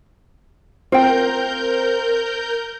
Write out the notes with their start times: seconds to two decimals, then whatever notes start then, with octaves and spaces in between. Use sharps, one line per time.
0.92 C4 F4 A#4 G5 G6